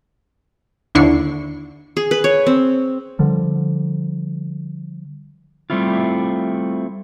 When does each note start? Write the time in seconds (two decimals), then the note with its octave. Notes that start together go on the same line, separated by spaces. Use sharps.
0.95 D#2 D3 D4 E4 C#6 C7
1.97 G#4
2.11 B4
2.24 C#5
2.47 C4
3.19 D3 F3 G3
5.70 G3 A3 C4 E4 F4